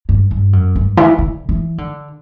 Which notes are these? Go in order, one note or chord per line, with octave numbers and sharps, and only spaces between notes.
G2
G2
F#2
G2
E3
D3
E3
D3